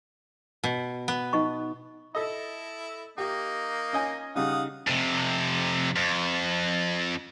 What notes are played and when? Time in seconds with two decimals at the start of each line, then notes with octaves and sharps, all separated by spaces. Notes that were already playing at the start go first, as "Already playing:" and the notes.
0.64 B2
1.08 B3
1.33 D#4 D#5 C#6
2.15 E4 A4 D#5
3.18 A#3 D#4 G4
3.93 C#4 D#5 G#5
4.36 C#3 G3 D#4 F5 F#5 D#6
4.87 F2 C3
5.96 F2